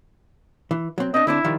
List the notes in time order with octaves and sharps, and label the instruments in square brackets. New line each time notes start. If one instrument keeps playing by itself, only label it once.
[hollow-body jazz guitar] E3
F#3 C4
[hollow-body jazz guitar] C4 D4 [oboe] D#5
[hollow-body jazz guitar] D3 C4 D4 [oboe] E4
[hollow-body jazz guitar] D#3 F3 G3